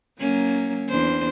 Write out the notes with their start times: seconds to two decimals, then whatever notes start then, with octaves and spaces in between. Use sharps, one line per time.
0.20 F#3 A#3 C#4
0.88 E2 D4 C5